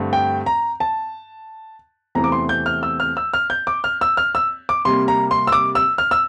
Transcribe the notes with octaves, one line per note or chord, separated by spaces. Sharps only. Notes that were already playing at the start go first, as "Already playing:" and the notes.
Already playing: G2 D3 A3 C4
G5
A#5
A5
E2 C3 E3 A3 C4 A#5
D6
C6
G6
F6
E6
F6
E6
F6
G6
D6
F6
E6
F6
E6
D6
C3 G3 A#3 C6
A#5
C6
E6
D6
E6
F6
E6